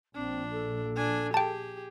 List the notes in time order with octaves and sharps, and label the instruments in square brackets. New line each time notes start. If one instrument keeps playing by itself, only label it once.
[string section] A#1 [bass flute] C4 [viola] D4
[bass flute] A4
[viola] D4 G#5
[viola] G4 G#4 [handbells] G5 A5